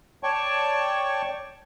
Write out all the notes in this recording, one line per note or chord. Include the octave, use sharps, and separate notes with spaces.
C#5 D5 G5 A5 C#6